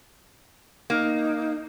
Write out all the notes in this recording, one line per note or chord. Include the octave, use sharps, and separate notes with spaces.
A#3 D#4